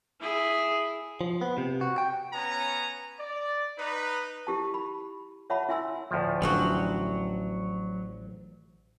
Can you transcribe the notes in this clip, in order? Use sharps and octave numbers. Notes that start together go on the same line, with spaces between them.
E4 G#4
F3
B3
C3
F#4
G5
B3 C#4 B4 G#5 A#5
D5
D#4 B4
E4 G4 A5
B5
C#5 E5 F#5 A5 B5
E4 E5 G#5 C6 E6
D2 A2 F3
A1 D3 E3 F#3 F4 F#4